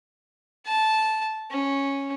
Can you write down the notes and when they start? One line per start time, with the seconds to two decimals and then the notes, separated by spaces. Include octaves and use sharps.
0.66 A5
1.51 C#4